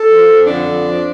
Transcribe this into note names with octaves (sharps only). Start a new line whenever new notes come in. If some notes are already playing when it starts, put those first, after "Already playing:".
Already playing: A4
F3
F2
D3 D4
F2
F3